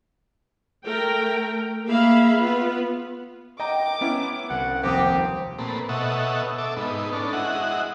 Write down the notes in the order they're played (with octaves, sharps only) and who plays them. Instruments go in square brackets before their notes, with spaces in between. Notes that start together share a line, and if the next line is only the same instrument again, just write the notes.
[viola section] A3 A#4 G5
A#3 G#4 E5 F5 B5
B3 F4 B4
[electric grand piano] D#5 A#5 [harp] G5 [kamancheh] D6
[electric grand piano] B3 C#4 E4
[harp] C2 [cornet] F#5
[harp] F1 [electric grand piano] D#2 D6 D#6 [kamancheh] C4 [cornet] G4
[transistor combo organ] A#2 A3 C4 B4
B2 A4 C#5 D#5 E5 F#5
A4 E5 D6
G#2 B3 D#4
C#4 D4 A4
G#3 E4 F#4 D#5 F#5